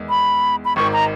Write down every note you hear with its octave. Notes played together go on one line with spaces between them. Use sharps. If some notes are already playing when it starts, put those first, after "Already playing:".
Already playing: E2 D#3 G#3
B5
B5
G#1 G#2 D#3 C#6
A#5